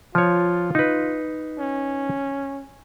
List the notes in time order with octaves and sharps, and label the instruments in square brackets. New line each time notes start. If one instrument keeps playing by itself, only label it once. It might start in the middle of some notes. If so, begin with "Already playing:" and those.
[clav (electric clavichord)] F3 C#5 [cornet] F4
[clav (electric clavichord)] D#4 B4
[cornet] C#4